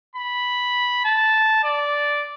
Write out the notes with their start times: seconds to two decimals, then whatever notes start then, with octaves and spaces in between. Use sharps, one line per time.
0.16 B5
1.05 A5
1.64 D5